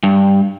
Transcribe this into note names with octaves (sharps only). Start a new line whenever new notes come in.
G2